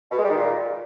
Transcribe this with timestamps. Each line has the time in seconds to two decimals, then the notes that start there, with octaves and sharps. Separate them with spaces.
0.11 B2
0.18 G#3
0.24 G3
0.30 D#3
0.36 A#2